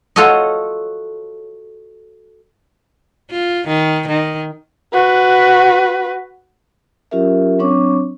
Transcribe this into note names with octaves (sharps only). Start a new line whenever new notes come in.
F4 F#4 A4 C#5 D#5
F4
D#3
D#3
F#4 B4
F#3 C#4 F4 G4 A#4 E5
F#3 C4 D4 C#5 C#6 D6